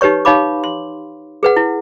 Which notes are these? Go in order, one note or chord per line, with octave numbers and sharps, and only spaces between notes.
D#4 G4 B4 C#5 C#6
D#4 C#5 F5 B5 D6
C6
G#4 B4 F#5
E4